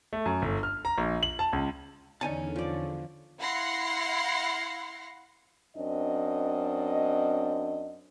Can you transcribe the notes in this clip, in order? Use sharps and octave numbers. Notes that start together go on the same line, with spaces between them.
A3
F#2
G1
F6
A#5
A#1
F#7
A5
C#2
E2 D3 C#4 D#4 G#5 A5
F3 D5
E4 F5 F#5 C6 A#6 C#7
F#2 C4 D4 D#5